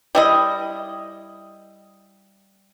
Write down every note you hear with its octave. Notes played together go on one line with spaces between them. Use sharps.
G3 E4 D#5